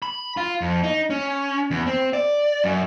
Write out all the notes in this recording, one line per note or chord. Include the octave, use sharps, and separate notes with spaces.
B5
F4
F2
D#4
C#4
E2
C4
D5
F#2